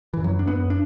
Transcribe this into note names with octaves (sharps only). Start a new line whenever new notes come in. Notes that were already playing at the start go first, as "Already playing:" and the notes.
F#2 E3
F#3
D4
F#2 B3
D4